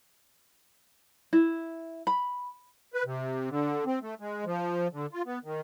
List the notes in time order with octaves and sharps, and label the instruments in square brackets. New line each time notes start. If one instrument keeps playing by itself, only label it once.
[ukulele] E4
B5
[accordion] B4
C3
D3
C4
A3
G#3
F3
D3
F4
B3
D#3